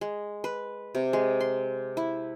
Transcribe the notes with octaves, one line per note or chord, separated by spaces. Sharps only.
G#3
B4
C3
G#3
C6
E4